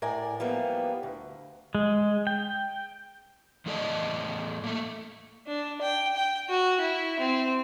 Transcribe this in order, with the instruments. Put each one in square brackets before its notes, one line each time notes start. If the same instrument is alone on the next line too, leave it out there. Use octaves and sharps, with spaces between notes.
[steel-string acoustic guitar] A2 A#4 D5 G#5
E3 F3 G3 A#3 B3
D2
[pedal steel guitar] G#3
G5
[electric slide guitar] E2 A2 A4 D5 D#5 A5
A3 A#3
[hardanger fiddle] D4
G5
G5
F#4
E4
C4